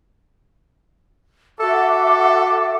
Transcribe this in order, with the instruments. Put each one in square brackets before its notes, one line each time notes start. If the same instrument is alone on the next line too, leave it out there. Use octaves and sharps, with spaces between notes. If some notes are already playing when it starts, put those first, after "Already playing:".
[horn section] F#4 A4 [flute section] E5 F#5 D6